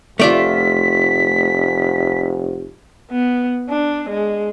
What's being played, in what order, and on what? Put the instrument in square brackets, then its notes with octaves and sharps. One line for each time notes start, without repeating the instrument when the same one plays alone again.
[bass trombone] F1 [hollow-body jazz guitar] A3 D5 [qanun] F4 E5 A#5 [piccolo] B6
[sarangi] B3
D4
G#3